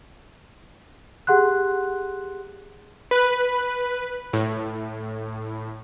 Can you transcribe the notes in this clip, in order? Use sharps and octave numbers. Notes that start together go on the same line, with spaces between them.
G4 G#4 F#5 C6 F#6
B4
A2